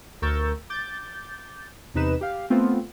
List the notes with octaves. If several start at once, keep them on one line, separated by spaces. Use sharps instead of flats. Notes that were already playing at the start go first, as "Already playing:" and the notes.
D2 A#4 C#6 E6 G6 A6
D6 G6 A6
E2 C3 D#4 B4 E7
G4 F5
A3 B3 C4 F4